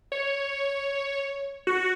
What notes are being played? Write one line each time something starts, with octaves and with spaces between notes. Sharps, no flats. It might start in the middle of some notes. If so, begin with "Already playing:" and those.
C#5
F#4